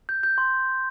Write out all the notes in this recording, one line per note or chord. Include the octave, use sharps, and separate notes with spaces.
G6
G6
C6